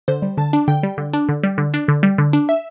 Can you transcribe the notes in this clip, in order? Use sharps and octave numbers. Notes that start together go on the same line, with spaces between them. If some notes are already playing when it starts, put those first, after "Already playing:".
D3 C5
G3
D3 A5
D4
D3 G5
G3
D3
D4
D3
G3
D3
D4
D3
G3
D3
D4
E5